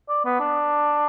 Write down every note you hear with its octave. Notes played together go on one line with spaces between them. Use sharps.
D5
B3
D4